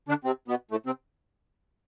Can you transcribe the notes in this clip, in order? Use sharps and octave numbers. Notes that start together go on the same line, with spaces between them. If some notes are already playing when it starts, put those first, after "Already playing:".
D3 D4
C3 C4
B2 B3
A2 A3
C3 C4